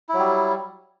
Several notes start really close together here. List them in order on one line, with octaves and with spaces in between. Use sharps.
E4 F#3 G3